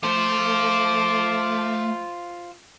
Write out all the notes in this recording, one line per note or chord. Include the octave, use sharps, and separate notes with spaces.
A3 F4 C5 D6